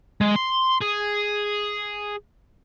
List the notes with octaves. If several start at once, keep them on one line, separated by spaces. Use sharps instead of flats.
G#3
C6
G#4